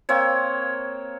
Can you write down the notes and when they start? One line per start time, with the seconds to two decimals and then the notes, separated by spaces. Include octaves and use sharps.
0.09 A#3 C4 C#5